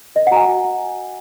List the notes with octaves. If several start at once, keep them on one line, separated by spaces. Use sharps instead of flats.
A#4 D#5
F#5
F#4 A#5
G#5
F#4
F#4